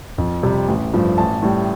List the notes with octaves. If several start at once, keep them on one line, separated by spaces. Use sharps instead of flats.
F2
C3 G3
A1
G2 F3 A3
A1 A5
A2 G3